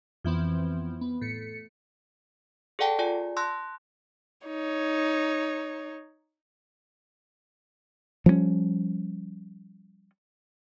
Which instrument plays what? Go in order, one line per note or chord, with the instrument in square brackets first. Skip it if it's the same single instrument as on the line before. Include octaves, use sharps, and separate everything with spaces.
[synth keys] F2 E3 B3 C4
B3
A2 C#7
[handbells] G#4 A4 D5 F#5 G5 A5
F4 G#4 D5 G#5
A5 C6 E6 F#6 G6 A#6
[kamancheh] D#4 C#5
[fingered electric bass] F3 G3 B3 C#4